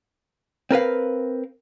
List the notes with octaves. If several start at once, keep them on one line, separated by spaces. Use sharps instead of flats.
C4 A#4 B4 F5